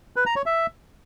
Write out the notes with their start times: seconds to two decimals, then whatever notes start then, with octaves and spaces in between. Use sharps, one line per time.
0.16 B4
0.26 A#5
0.36 C#5
0.46 E5